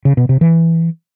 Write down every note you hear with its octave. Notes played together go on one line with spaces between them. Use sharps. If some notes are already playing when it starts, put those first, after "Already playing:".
C#3
B2
C3
E3